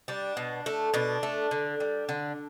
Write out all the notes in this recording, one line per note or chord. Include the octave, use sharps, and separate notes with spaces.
G3 D4
B2
A3
B2 D4
A3
D3
G3
D3